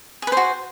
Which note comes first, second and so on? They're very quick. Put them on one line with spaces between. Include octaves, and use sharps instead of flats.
G#4 B4 C5 F#4